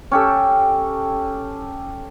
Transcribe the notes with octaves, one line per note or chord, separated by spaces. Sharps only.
C#4 G4 A4